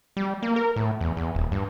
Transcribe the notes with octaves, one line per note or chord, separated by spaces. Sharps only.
G3
A#3
A#4
A2
E2
E2
D#1
G2